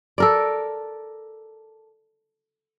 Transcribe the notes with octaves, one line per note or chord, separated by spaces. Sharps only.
A4 A#4 D5